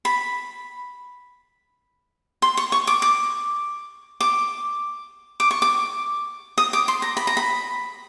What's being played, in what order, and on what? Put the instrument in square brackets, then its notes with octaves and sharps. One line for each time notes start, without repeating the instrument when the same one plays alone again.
[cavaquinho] B5
C6
C#6
C#6
D6
D6
D6
D6
C#6
D6
D#6
D6
C6
A#5
B5
A#5
B5